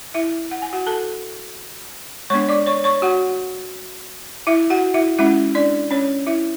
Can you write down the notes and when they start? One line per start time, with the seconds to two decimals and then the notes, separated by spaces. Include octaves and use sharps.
0.14 E4 E5
0.51 F#5
0.62 G#5
0.73 F#4 F#5
0.86 A4 A5
2.30 G#3 B3 D4 C#5 C#6
2.49 D5 D6
2.66 C#5 C#6
2.84 C#5 C#6
3.02 F#4 F#5
4.47 E4 E5
4.70 F#4 F#5
4.94 E4 E5
5.18 G#3 C#4 E4 E5
5.55 D4 D5
5.91 C#4 C#5
6.27 E4 E5